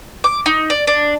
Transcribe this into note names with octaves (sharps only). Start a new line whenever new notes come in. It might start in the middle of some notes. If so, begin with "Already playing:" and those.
D6
D#4
D5
D4